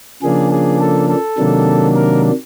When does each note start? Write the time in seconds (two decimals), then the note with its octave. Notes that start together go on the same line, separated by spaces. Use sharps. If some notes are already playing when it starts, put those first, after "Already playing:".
0.23 C#3 F3 A#3 D4 G#4
0.52 G#4
0.80 A4
1.09 A4
1.38 C3 D#3 F#3 A#3 D4
1.96 A#4